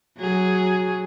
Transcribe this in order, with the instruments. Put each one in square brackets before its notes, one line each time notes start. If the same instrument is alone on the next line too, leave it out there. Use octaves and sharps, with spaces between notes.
[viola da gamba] F#3 G#4